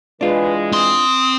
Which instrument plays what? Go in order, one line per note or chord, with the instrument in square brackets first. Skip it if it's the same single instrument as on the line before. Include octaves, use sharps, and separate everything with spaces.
[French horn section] E3 G#3 [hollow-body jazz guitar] D4 F4 [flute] B4
[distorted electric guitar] C4 C6 [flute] D#6